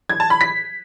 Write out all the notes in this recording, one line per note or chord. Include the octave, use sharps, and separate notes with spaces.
G#6
A5
B5
B6